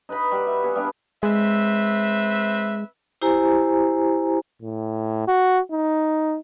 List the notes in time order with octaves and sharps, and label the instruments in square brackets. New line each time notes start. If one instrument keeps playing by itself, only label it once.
[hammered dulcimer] D#4 B4 D#5 B5
G3 F#4
E5
B3 G#4 F#5
G3 B3 D4 F5
[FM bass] G#3 [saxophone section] C4 B4 E5
[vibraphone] E4 G4 C5 G#5 A#5
[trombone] A2
F#4
D#4